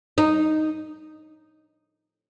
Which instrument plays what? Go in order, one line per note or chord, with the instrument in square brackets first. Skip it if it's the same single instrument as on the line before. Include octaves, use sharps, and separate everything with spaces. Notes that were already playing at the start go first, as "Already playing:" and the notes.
[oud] D#4